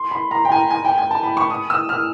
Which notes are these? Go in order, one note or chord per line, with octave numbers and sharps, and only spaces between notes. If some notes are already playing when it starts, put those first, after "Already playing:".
Already playing: C6
B5
A#5
G5
G#5
G#5
G5
G#5
A5
B5
C#6
D#6
E6
F6